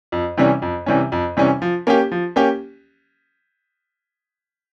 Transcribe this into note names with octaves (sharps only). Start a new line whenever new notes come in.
F2
C3 E3 G3 C#4
F2
C3 E3 G3 C#4
F2
C3 E3 G3 C#4
F3
A#3 C#4 G4
F3
A#3 C#4 G4